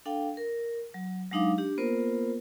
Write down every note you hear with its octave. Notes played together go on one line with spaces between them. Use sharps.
D4 A4 F5 G5
A#4
F#3
F#3 G#3 D4 D#4 F5 D6
D4 G4
A#3 B3 F4 A#4 C5